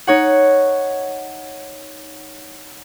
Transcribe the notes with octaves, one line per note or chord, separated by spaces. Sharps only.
D#4 C#5 F#5